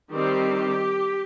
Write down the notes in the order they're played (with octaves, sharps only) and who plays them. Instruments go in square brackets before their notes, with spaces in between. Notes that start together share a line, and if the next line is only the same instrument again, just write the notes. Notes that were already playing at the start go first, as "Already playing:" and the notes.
[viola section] D#3 G3 C4 G4